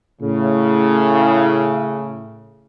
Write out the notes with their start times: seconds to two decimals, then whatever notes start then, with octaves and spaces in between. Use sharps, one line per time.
0.22 A2 C#3